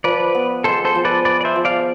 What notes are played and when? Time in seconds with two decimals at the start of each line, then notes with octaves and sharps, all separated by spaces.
0.04 F3 B4 D5
0.35 B3
0.64 G#3 A4 C5
0.85 A4 C5
0.95 F3
1.05 B4 D5
1.25 B3 B4 D5
1.41 D5
1.45 C5 E5
1.56 F3
1.65 D5 F5